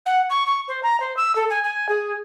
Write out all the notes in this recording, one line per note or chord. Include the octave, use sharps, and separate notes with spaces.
F#5
C#6
C#6
C5
A#5
C5
E6
A4
G#5
G#5
G#4